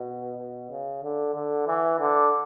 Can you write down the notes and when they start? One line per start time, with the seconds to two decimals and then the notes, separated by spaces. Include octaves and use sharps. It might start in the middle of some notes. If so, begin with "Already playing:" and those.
Already playing: B2
0.38 B2
0.70 C#3
1.03 D3
1.35 D3
1.67 E3
2.00 D3